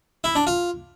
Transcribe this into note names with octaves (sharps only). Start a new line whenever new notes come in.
E4
D4
F4